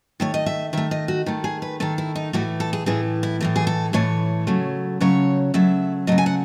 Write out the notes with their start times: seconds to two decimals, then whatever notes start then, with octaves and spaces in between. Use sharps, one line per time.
0.20 D#3 A3 C#5
0.34 D#5
0.46 E5
0.73 D#3 A3 E5
0.91 D#5
1.08 F#4
1.26 D#3 A3
1.44 G#4
1.62 B4
1.80 D#3 A3 A4
1.98 E4
2.15 D#4
2.33 A2 E3 A3 F#4
2.60 A4
2.73 G#4
2.86 A2 E3 A3 G#4
3.23 E4
3.41 A2 E3 A3
3.56 G#4
3.67 A4
3.93 A2 E3 A3 C#5
4.47 C#3 F#3 A3
5.00 C#3 F#3 A3 C#5
5.54 C#3 F#3 A3 E5
6.07 C#3 F#3 A3 D#5
6.18 G#5
6.26 F#5